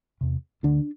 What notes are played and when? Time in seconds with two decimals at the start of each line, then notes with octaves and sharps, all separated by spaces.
0.21 E2 C3
0.63 D2 D3 D4